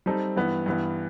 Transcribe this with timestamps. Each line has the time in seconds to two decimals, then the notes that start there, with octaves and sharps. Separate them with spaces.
0.06 G3 C4 D#4 A4
0.37 G2 E3 B3
0.66 G2 E3 B3